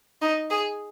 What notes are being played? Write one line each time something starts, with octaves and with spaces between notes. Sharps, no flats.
D#4
G#4